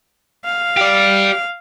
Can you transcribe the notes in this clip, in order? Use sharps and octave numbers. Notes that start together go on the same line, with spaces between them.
F5
G4 D5